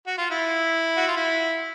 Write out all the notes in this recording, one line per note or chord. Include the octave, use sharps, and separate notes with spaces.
F#4
F4
E4
F#4
F4
E4